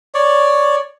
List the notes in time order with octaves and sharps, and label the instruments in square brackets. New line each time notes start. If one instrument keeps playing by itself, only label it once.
[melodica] C#5 D5